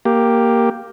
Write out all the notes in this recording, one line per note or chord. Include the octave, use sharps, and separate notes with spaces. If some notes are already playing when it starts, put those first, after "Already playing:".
A#3 G4